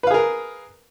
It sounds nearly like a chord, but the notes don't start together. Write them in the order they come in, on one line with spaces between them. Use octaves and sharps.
B4 F5 G#4 A#4